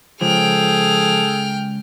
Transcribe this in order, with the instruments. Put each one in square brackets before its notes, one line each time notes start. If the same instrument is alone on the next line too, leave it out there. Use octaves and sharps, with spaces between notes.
[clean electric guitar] C#2 [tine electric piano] F3 [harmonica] G#4 A4 [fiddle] G5 F6